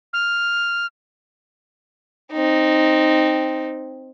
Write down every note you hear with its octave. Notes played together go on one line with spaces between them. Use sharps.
F6
C4 D#4